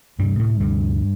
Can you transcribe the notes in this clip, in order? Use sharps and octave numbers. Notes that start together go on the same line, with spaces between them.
D2 G2 C3 G3
A2 A3
D2 G2 C3 G3